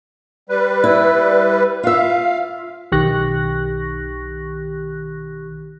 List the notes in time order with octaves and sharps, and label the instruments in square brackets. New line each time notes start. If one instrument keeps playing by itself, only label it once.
[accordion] G3 B4
[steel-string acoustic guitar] E4
[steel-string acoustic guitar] F4 E5 [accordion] F5
[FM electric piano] B1 D#3 G4 C#6 F#6 A#6